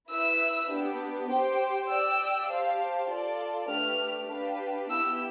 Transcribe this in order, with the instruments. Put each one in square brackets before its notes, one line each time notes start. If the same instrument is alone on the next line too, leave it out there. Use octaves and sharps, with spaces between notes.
[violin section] E4 B4 E5 [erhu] E6
[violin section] B3 D4 G4
G4 C5 G5
[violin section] G4 D5 G5 [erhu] E6
[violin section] G4 C5 F5 A5
F4 A4 D5 A5
[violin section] A3 D4 G4 B4 [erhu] F6
[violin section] D4 G4 B4 F5 A5
[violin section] B3 E4 G4 [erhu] E6